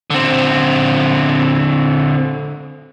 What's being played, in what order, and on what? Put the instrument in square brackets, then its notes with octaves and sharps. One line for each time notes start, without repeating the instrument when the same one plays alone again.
[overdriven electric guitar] D3 C4